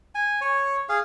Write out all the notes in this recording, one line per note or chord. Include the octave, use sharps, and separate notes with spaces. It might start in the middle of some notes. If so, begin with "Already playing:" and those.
G#5
C#5
G#4 F5